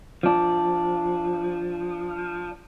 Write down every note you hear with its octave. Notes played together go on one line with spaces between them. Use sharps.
F3 D4